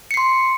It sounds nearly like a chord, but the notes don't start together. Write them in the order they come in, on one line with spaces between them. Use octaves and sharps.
C#7 C7 C6